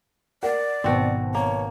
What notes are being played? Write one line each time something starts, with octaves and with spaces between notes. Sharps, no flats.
A#4 D5 F#5
G#1 B2 C4 F#4
A#3 C#5